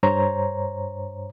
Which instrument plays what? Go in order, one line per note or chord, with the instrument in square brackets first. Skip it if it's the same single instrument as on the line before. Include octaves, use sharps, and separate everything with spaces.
[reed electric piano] G2 C5 C#5 A#5